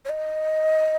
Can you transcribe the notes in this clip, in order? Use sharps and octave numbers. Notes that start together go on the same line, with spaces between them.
C#5
D#5